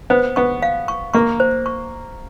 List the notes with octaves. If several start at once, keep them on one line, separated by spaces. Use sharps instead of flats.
B3 C5
B3 C#6
F5
C#6
A#3 C#6
C5
C#6